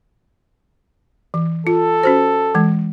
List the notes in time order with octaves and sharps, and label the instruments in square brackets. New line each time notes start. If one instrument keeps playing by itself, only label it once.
[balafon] E3
[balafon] F4 [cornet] A4
[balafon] C#4 F#4 C5
E3 G#3